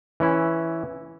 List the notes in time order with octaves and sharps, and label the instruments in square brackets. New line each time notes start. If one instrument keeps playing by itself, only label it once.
[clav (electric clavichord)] E3 C#4 E4